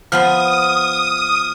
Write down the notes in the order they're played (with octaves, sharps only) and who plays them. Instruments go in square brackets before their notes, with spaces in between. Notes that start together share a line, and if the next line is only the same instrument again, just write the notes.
[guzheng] F3 B3 C6 [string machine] D#6 [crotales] F6